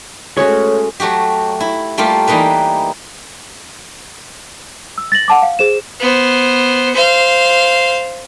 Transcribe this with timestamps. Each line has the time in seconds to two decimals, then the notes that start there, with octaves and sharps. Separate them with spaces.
0.37 G#3 A3 C#4 F#4 C#5
1.00 F#3 A3 F#4 G4
1.60 E4
1.98 G3 A3 A#3 F4 G4
2.28 E3 G3 A#3 D#4 B4
4.98 E6
5.12 A6 A#6 F#7
5.28 F#5 A5 D6
5.42 F5
5.59 G#4 C5 E7
6.00 B3 C5
6.94 C5 F5